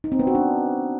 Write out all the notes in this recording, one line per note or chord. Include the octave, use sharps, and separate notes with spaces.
D#4
C4
B3
F#4
D4